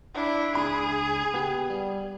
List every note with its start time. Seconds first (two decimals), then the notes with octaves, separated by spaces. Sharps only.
0.14 D4 E4
0.55 C#2 D4 G#4 B5
1.34 B3 G4
1.70 G3